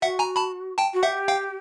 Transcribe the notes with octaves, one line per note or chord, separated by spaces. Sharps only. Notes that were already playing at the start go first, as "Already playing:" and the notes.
F#4 E5 F#5
G#5 A#5
A5 B5
G5 A5
F#4
G4 E5 F#5
F5 G5